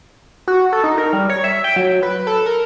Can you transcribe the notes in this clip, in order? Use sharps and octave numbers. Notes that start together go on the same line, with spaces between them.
F#4
A4
D#4
A#4
G3
C#5
E5
G5
F#3
B4
A4
A#4